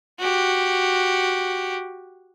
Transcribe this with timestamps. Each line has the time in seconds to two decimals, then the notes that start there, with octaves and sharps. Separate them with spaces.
0.20 F#4 G4